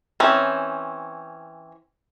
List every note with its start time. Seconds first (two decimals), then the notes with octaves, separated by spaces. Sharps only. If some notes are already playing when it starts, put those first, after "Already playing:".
0.20 E3 C4 C#4